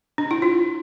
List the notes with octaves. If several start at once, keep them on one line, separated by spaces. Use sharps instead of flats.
D4
E4
F4